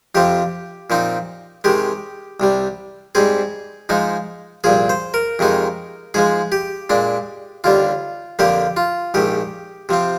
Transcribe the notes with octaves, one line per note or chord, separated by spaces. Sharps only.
F2 C3 F3 C4 G4
A#2 F3 C4 D#4
C3 D#3 G#3 G4
C2 C3 G3
G#2 G3 C4 G#4
G#2 F3 G#3 D#4
C2 A#2 F3 G#4
C5
A#4
F2 C3 D#3 G#3 D#4
G#2 F3 G#3 G#4
G4
A#2 G#3 D4
D#2 D3 G3 F4
F2 D3 F3 A#3 G4
F4
A#1 G#2 D#3 G4
C3 F3 C4